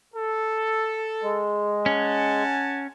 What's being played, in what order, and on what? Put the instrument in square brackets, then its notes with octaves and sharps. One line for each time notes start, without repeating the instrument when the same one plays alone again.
[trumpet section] A4
[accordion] G#3
[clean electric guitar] C#4 [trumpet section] F#5 G#5 A5